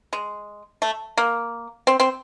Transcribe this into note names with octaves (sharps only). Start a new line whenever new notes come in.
G#3
A3
A#3
C4
C4